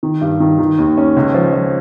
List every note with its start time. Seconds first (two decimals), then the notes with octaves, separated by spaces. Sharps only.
0.03 D#3
0.21 G2
0.40 D#3
0.59 D#3
0.79 D#2
0.97 C#4
1.16 C#2
1.34 F3
1.53 F3